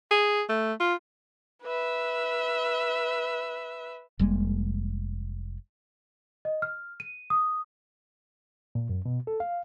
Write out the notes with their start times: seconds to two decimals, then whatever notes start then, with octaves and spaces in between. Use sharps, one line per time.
0.11 G#4
0.49 A3
0.80 F4
1.63 B4 E5
4.19 F1 G3 G#3 A#3
6.45 D#5
6.62 F6
7.00 D#7
7.30 D#6
8.75 A#2
8.89 F#2
9.06 B2
9.27 A4
9.40 F5